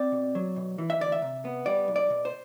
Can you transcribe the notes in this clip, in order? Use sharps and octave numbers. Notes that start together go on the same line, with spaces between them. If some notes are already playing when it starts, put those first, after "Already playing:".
Already playing: C4 D5
B2
F#3
B2
E3
E5
D2 D5
E5
C3
B3
G3 D5
B1
D5
B2
C5